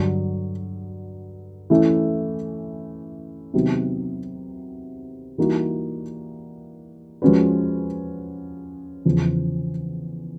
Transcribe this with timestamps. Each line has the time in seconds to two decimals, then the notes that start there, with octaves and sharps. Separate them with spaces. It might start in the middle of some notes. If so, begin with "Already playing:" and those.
Already playing: G2 D3 F#3
1.70 E3 A3 C#4 E4
3.54 C3 D#3 F#3 B3
5.38 E3 G3 A#3 D#4 F#4
7.22 F3 G#3 C#4 F#4 B4
9.05 E2 C#3 F3